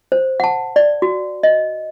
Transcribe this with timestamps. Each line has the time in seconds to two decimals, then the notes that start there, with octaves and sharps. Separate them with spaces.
0.12 C5
0.40 F#5 A5
0.76 D5
1.02 F#4
1.43 D#5